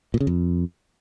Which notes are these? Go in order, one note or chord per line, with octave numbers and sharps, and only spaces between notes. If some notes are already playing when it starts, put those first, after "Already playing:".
A#2
C#3
F2